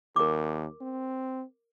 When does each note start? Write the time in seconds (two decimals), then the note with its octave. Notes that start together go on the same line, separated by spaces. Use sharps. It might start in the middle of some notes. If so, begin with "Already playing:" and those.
0.16 D#2 A#4 D6
0.81 C4